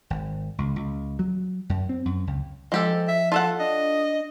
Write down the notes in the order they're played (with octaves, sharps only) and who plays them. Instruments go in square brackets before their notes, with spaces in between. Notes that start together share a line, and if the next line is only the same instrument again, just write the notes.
[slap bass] G#1
C#2
C#2
F#3
F#2
C4
F#2
C#2
[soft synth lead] F3 [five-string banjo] G#3 G4 A4
[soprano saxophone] E5
[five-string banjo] F4 A4 F#5 [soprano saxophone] A5
[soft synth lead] D4 [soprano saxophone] D#5